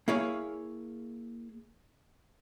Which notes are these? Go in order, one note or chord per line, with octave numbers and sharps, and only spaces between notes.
A#3 E4 G#4 C#5 F5